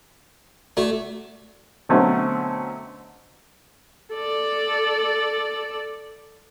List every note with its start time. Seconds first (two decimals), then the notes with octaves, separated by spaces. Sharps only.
0.77 A3 F#4 D5
1.89 B2 D3 F#3 A3 C4 C#4
4.13 A4 D5